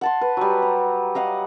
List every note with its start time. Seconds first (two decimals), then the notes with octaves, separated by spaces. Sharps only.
0.01 F#5 A5 C6
0.21 B4
0.37 F#3 G3
0.62 A#5
1.15 D#5 F5 F#5